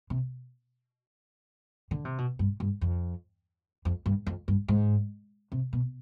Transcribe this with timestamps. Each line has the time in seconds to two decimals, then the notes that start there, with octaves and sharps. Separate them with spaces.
0.10 C3
1.91 D3
2.05 C3
2.18 B2
2.39 G2
2.60 G2
2.81 F2
3.85 F2
4.06 G2
4.27 F2
4.48 G2
4.68 G#2
5.52 C3
5.73 B2